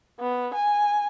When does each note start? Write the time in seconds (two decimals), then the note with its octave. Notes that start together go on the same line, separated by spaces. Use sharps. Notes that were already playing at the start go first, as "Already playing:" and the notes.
0.20 B3
0.54 G#5